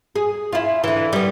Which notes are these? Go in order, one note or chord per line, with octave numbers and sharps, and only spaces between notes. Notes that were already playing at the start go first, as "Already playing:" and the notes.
G#4
E4 F4
D3 E3
G3 B3